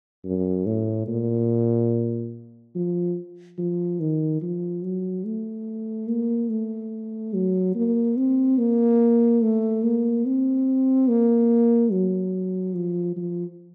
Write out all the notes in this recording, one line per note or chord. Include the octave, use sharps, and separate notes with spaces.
F#2
A2
A#2
F3
F3
D#3
F3
F#3
A3
A#3
A3
F#3
A#3
C4
A#3
A3
A#3
C4
A#3
F#3
F3
F3